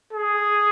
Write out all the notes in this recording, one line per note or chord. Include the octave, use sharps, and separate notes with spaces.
G#4